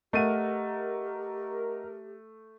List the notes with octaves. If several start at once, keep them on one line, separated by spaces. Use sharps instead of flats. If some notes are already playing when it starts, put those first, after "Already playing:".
A3 G4 A#4 D#5 F#5 D#7